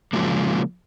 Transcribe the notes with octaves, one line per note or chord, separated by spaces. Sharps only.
C#3 F3 F#3 G#3 A#3